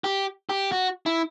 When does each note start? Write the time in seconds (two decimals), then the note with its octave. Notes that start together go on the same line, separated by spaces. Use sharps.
0.04 G4
0.49 G4
0.72 F#4
1.06 E4